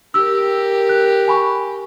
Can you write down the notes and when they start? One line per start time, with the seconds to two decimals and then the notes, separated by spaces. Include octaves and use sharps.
0.14 G4 A#4 E6
0.89 F#6
1.28 G#5 B5 C#6